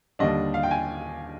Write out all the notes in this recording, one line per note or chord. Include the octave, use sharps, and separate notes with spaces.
D#2 D3 G3 D4 D#5
F5
G5
G#5